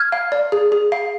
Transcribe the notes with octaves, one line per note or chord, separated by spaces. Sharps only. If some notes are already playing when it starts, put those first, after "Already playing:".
Already playing: F6 G#6
F5
D5
G#4
G#4
F5